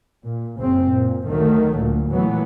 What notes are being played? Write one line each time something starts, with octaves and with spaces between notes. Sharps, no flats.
A#2
F#1 C#3 C4
A#2
D2 D#3 F#3 A3
D2 A#2
A#2 E3 F#3 A3 B3